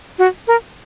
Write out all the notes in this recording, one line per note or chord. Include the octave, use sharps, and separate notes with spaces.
F#4
A#4